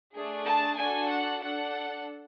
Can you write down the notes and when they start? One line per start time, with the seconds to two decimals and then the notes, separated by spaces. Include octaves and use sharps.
0.14 A3 D4 G#4
0.46 A5
0.78 D4 F#4 A4 G#5
1.10 F#5
1.41 D4 A4 F#5